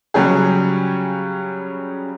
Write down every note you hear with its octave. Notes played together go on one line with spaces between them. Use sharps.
C#3 F#3 G3 C#4 G4 G#4